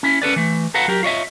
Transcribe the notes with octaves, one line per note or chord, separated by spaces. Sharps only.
C#4 E4
C#4 A4 B4 D5
E3 A3
A4 B4 F5 F#5 A#5
F#3 G4 A#4
F4 C#5 D#5 E5